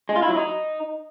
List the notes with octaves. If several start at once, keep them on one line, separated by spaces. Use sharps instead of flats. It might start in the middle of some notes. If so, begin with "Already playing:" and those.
G#3
F4
E4
F#3
D#4